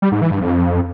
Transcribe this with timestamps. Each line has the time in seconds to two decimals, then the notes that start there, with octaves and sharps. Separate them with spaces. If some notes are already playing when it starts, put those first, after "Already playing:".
0.02 G3
0.12 G#2
0.22 E3
0.31 G2
0.41 F2